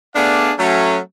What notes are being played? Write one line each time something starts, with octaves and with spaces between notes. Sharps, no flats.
A3 B3 D4 G#4 D5 F5
F#3 A3 C#4